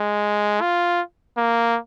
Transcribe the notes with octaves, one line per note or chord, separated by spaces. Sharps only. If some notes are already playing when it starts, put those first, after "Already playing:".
Already playing: G#3
F4
A#3